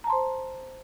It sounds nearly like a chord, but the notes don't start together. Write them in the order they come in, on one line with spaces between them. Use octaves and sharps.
A#5 A5 C6 C5